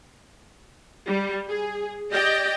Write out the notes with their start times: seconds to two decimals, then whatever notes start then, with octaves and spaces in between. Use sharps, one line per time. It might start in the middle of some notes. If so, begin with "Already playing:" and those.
1.08 G3
1.48 G#4
2.11 G4 D5 D#5 G5